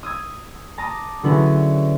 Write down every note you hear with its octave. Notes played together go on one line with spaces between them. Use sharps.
D#6 E6 G#6
A5 A#5 D6 D#6
D3 F#3 B3 C#4 E4 G#4